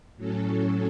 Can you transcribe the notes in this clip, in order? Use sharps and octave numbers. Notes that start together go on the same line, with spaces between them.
A2 F#3 C#4 A4